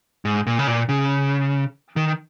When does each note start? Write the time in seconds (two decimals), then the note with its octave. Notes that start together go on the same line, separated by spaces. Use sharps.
0.25 G#2
0.47 A#2
0.59 C#3
0.67 A#2
0.89 C#3
1.96 D#3